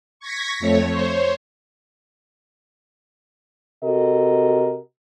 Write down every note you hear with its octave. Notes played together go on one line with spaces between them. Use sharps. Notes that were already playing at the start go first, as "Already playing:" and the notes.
C#6 G#6 A#6 B6
F2 A3 C#5
C5 C#5
C3 F#4 A4 A#4 D#5